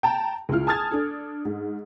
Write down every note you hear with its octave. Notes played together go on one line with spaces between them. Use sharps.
G5 A5 A#5
C#2 C#3 E4 F4 F6
G#5 A5 D#6 F6 G#6 A6
D4 A4
G#2